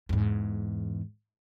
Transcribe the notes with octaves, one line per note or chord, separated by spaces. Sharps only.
E2 G#2